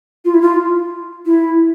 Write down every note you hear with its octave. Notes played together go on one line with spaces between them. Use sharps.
F4
E4
F4
E4